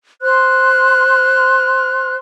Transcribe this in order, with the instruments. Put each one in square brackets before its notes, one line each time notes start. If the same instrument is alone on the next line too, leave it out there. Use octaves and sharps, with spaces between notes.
[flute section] C5 C6 F6 F#6